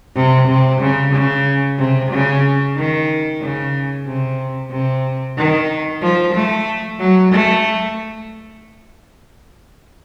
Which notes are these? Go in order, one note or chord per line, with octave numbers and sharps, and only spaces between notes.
C3
C3
C#3
C#3
C3
C#3
D#3
C#3
C3
C3
D#3
F3
A3
F#3
A3